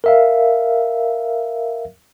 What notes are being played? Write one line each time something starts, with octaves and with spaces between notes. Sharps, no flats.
A#4 E5 F5